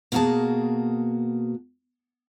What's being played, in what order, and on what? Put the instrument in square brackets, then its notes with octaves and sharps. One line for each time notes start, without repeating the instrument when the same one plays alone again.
[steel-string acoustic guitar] B2 A#3 F4 F#4 G#4 A5